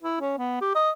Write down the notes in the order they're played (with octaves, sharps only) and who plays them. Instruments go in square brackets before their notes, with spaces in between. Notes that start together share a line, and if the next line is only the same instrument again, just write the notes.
[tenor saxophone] E4
C#4
B3
G4
D#5